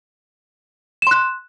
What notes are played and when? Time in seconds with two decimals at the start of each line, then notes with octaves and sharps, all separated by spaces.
1.02 E7
1.07 C6
1.11 F#6